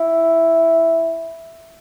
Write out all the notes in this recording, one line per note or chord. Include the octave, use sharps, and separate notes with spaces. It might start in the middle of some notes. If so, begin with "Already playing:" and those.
Already playing: E4